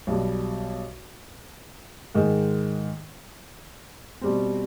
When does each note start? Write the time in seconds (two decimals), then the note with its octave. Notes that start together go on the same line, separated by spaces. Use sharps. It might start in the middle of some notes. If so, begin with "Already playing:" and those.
0.07 B1 B2 G3
2.15 G#2 D#3 G#3
4.21 B2 G3 C4